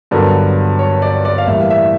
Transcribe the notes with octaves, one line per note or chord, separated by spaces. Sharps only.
G2 D3 F#3 B3 A#4
C#5
D5
D5
F5
A2 E3 G3 A#3 E5
F5
E5